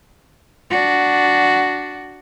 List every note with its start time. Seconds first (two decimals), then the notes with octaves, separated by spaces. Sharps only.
0.70 D4 F#4